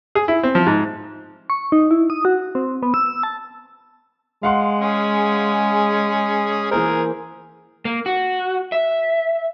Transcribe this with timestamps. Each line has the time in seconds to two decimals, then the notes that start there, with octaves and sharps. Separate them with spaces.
0.15 G#4
0.28 E4
0.43 C4
0.55 F3
0.66 G#2
1.50 C#6
1.72 D#4
1.91 E4
2.10 D#6
2.25 F#4
2.55 C4
2.83 B3
2.94 E6
3.06 E6
3.23 A5
4.43 G#3 F5 F#5 C6
4.81 C#4 G#4
6.71 E3 A#3 G#4 A#4 C5
7.85 A#3
8.06 F#4
8.72 E5